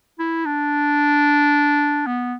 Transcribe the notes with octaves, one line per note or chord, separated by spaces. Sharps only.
E4
D4
B3